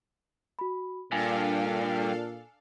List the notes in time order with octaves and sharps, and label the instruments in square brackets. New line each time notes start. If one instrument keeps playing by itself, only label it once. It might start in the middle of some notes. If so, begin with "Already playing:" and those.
[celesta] F#4 B5
[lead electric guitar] G2 [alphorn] A#2 [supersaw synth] D4 A4 F5 [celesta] G#5